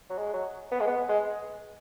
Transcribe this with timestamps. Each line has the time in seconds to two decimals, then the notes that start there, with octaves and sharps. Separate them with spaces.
0.10 F#3
0.18 G#3
0.34 F#3
0.72 B3
0.80 G#3
0.87 B3
1.09 G#3